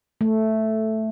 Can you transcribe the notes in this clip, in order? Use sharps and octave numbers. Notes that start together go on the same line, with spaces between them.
A3